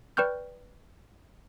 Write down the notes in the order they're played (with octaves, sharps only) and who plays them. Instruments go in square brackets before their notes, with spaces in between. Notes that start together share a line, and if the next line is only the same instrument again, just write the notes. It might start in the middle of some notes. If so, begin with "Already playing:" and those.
[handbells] B4 D5 G5 C#6 F6 G6